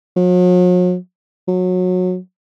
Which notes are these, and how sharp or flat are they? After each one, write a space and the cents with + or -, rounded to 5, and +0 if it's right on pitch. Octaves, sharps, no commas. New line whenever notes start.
F#3 -45
F#3 -25